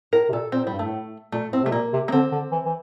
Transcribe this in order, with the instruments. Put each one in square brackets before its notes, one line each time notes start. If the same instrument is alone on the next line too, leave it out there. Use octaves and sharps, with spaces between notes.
[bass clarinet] A2 [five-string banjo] A#4
[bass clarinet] C3
[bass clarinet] A#2 [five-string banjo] A4
[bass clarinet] A#2 [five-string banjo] C4
[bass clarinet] A2 [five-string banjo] G3
[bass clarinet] G2
[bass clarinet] A2 [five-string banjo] A3
[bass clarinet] A#2 [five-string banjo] A3
[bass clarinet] A2 [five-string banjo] C4
[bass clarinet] C3 [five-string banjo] A3
[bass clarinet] A#2 [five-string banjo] A#3
[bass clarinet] C3
[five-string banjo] A#3
[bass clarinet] D3 [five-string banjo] C4
[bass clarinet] D3
E3
E3